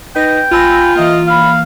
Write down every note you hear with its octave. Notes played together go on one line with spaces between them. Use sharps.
D#4 B4 G5 A#6
A1 F4 G#5 B5 E6 A#6
E3 A#3 D#5 F5
F5 B5